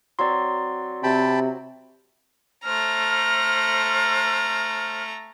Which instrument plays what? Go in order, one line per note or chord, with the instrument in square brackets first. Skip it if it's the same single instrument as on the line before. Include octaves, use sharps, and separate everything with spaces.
[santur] F#3 C4 [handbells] D5 C6
[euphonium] C3 [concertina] G5 A5 B5
[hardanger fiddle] A3 A#5 [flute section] C5 F6 F#6